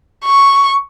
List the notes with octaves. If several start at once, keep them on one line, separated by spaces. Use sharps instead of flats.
C#6